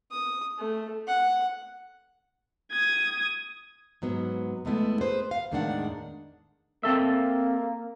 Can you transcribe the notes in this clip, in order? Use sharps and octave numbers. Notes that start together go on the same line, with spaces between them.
D#6
A3
F#5
D#6 G#6
G#2 F#3 B3
E2 G#3 A3 B3 E4
G#4 B4 C5
F5
E2 A2 D#3 G#3 D4 F#5
A#3 C4 A4 E5